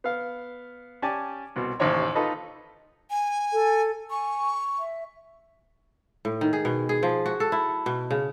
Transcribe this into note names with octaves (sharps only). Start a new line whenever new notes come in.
B3 F5
C#4 G4 D5 G#5 A5
C2 B2
A1 D#2 C3 C4 C#5 C#6
D#4 F4 A4 B4 D#5
G#5
A4
G#5 C#6
E5
A2
D#3
G#4
B2
G#4
F3
F#4
A4
E4
B2
C#3